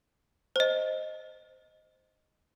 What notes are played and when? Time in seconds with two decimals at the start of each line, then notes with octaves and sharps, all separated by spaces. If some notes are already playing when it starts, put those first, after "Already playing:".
0.56 C5 D#5